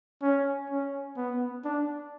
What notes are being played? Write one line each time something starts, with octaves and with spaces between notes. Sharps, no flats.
C#4
C#4
B3
D4